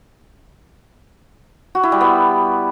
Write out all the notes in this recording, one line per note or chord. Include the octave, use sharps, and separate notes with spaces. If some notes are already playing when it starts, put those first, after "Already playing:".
F#4
E4
G3
B3